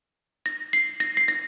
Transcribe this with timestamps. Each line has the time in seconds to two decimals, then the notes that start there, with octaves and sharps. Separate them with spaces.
0.46 A#6
0.73 C7
1.00 A#6
1.17 C7
1.28 A#6